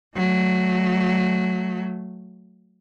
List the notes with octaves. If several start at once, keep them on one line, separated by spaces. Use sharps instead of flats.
F#3 A3